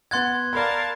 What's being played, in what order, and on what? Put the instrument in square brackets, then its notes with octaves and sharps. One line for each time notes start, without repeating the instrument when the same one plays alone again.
[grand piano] B3 F#5 A6 [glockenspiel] C6 F#6 G#6
[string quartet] A#4 F5 A5 [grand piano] D5 B5